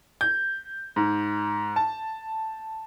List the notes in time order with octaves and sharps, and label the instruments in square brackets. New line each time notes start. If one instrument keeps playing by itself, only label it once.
[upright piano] G6
G#2
A5